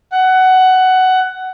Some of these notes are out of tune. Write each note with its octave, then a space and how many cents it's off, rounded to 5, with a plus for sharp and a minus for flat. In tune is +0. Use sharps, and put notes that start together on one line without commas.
F#5 +15